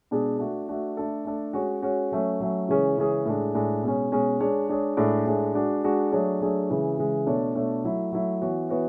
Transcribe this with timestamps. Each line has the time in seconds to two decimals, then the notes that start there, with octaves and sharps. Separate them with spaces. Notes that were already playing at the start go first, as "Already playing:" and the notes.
0.11 B2 G#3 D4 G#4
0.39 A3 D4 F#4
0.69 A3 D4 F#4
0.97 A3 D4 A4
1.25 A3 D4 A4
1.53 G#3 C#4 F#4 C#5
1.82 G#3 C#4 F#4 C#5
2.12 F#3 A3 C#4
2.40 F#3 A3 C#4
2.69 C#3 E3 G#3 C#4 G#4
2.98 C#3 E3 G#3 C#4 G#4
3.25 A2 G#3 D4
3.55 A2 G#3 D4
3.83 B2 G#3 C#4
4.12 B2 G#3 C#4
4.40 G#3 D4 G#4 C#5
4.69 G#3 D4 G#4 C#5
4.97 A2 G#3 D4
5.26 A2 G#3 D4
5.54 G#3 D4 F#4
5.84 G#3 D4 F#4
6.12 F#3 A3 D4 G#4 C#5
6.41 F#3 A3 D4 G#4 C#5
6.70 C#3 E3 G#3
6.98 C#3 E3 G#3
7.27 B2 A3 D4 A4 C#5
7.55 B2 A3 D4 A4 C#5
7.84 F#3 A3 E4
8.12 F#3 A3 E4
8.41 E3 B3 F#4 C#5
8.69 E3 B3 F#4 C#5